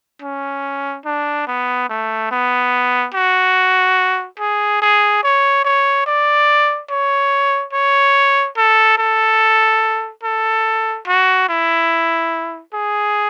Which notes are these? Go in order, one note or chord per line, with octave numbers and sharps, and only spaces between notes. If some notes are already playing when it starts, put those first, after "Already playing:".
C#4
D4
B3
A3
B3
F#4
G#4
G#4
C#5
C#5
D5
C#5
C#5
A4
A4
A4
F#4
E4
G#4